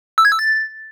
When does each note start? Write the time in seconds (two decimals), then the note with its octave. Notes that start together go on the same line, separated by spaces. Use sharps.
0.18 E6
0.25 G#6
0.32 E6
0.39 A6